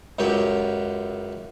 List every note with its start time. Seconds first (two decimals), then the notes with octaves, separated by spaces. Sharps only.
0.19 C#2 F#2 F#3 G4 G5